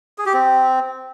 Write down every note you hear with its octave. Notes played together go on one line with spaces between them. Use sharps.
G#4
G4
C4